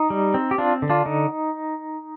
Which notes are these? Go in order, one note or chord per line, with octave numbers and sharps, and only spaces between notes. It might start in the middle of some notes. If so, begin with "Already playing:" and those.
Already playing: D#4
G3
C4
G4
C4 D4 F4
D3
D4 F4
D3 D#4